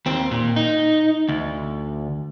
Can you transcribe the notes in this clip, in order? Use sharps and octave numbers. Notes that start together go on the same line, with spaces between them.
D#2 C4
A#2
D#4
D2